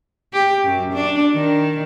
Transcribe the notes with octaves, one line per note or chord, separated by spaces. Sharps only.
G4
F#2
D4
D#3